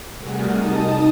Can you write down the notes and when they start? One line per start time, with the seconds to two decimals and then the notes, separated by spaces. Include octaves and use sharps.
0.16 C3 G3 A3 F#4 G#4 A#4
0.49 D#4 A5 D#6